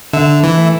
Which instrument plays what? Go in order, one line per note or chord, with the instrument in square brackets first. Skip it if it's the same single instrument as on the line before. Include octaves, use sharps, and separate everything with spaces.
[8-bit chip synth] D3 [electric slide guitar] E5
[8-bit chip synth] E3
[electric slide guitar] A3